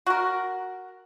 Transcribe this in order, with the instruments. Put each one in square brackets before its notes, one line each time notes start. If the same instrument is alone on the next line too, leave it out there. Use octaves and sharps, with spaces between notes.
[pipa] F#4 A#4